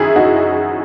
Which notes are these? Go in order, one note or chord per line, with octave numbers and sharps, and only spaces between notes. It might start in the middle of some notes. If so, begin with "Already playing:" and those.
Already playing: F#2 D#3 E4 G#4
D#4 F#4